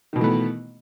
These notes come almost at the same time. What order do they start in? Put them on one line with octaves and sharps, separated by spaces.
D#3 B2 E3 A3 B3